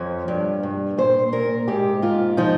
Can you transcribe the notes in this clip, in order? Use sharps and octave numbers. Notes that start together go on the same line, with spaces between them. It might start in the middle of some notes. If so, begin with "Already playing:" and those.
Already playing: F2 F3 C#5
G2
G2
A#2 C5
A#2 A#4
G#2 G4
G#2 F4
F3 D#4